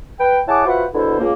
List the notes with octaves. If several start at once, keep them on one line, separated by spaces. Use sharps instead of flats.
B4 G5
E4 G#4 C#5 F#5 A5 D6
F4 F#4 B4 C5 E5 F#5
E2 B2 D3 E4 A4 C5
C#2 A#3